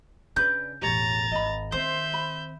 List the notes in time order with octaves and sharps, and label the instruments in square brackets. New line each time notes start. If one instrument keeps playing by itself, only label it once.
[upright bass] C#3 [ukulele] D4 B4 D5 [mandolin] G6
[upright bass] E1 A1 [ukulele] G4 C#5 [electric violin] A#5 A6
[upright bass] G#1 [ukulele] D#5 B5
[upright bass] D#3 C4 [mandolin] C5 [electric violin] E5 G6
[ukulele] B5